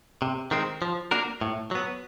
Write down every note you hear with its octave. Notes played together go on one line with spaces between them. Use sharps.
C3
D#3 G#3 C4
F3
A#3 D4 F#4 A#4
A2
F#3 B3